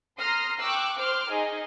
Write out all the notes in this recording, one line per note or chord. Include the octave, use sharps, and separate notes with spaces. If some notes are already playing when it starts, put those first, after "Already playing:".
A#5 C6 D#6 F6 A#6 C7
G5 C#6 D6 E6 F#6
C5 C6 D6 F6
D#4 G#4 D#5